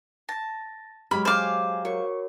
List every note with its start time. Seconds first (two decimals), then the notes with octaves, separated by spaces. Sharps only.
0.29 A5 A6 A#6
1.11 F#3 G#3 G4 B5 F6
1.25 C5 F5 G#5 D6
1.85 F#4 A#4 C#5 C#6